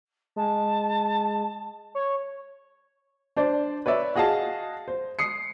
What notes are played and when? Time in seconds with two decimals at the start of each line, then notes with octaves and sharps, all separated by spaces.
0.36 G#3 A5
1.95 C#5
3.37 D4 C5 D5
3.86 B4 C#5 D5 E5
4.16 F#4 G#4 D#5 F5 A5
4.88 C5
5.19 D#6 C7 C#7